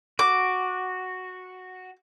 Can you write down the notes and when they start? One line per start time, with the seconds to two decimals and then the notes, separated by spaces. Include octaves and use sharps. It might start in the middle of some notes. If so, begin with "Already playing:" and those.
0.19 F#4 D6